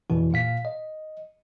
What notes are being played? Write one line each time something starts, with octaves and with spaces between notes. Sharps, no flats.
F2 B2 E3
A#2 F5 B6
D#5